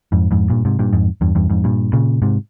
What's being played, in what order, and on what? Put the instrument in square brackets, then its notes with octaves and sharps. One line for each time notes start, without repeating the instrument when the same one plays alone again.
[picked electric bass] F2 G#2
F2 G#2
G2 A#2
G#2 C3
G2 A#2
F2 G#2
E2 G2
E2 G2
F2 G#2
G2 A#2
A#2 C#3
G#2 C3